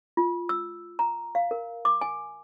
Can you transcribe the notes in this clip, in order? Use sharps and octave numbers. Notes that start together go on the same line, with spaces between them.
F4
E6
A#5
F5
A#4
D6
G#5